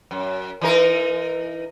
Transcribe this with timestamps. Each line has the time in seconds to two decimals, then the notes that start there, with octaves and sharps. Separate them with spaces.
0.11 F#2
0.61 E3 D#4 A#4